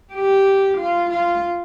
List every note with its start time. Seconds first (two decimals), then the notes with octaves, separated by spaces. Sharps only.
0.13 G4
0.78 F4
1.10 F4